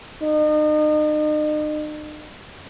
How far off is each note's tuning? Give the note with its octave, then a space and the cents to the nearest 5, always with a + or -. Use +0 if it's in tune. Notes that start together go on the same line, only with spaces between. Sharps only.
D#4 -40